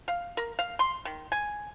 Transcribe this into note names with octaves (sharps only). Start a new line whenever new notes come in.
F5
A#4
F5
C6
D#3
G#5